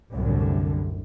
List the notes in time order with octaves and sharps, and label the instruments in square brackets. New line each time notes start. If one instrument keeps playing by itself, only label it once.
[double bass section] C2 F#2 A2 D3